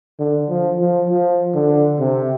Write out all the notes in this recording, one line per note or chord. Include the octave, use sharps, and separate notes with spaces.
D3
F3
F3
F3
D3
C3